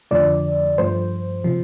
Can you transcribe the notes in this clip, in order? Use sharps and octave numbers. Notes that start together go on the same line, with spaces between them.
F2 D3 F3 A3 D5
G2 F3 A3 C5
C3 F3